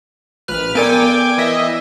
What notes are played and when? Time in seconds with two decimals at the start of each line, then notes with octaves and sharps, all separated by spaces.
0.48 A#1 B4 F6
0.75 B3 A#4 D5 G5 G#5 D6
1.38 E3 D#5 E5